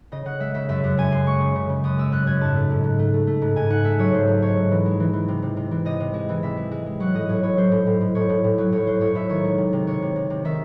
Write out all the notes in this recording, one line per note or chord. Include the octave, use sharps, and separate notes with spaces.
C#3 D#5
C#3 F#5
G#3 E5
C#3 E5
F#2 E5
F#2
F#2 G#5
F#2 C6
G#3 C#6
C#3
C#3
C#3
F#2 D#6
G#3 E6
F#2 F#6
F#2 G#6
G#2 A5
A3
G#2
G#2
A3
A3
A3
G#2
G#2 G#5
G#2 F#5
A3 E5
F#3 C#5
G#2 C5
A3
G#2 C#5
G#2
E3
G#3
E3
E3
C3
C3
C3
E3
C3 D#5
C3
G#3
E3
C3 E5
G#3
G#3
G#3
F#3 F#5
A2 D#5
A2 C#5
A2 C#5
F#3 C5
A2
A2
A2
A2 C#5
A2
A2
F#3
A2 C#5
F#3 C5
A2 C#5
A2 E5
D#3 C#5
G#3
C3
C3
C3 C#5
C3
C3
C3
D#3 E5